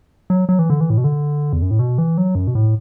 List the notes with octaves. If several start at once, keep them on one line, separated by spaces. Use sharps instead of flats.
F#3
F#3
E3
D3
E3
A2
B2
D3
E2
F#2
A2
B2
E3
F#3
F#2
B2
A2